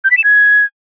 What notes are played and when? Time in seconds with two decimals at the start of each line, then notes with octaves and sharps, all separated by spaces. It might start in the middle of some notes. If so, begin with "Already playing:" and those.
0.04 G6
0.11 B6
0.18 E7
0.24 G#6